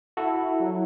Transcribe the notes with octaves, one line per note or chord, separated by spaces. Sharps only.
E4 F#4 A4
F#3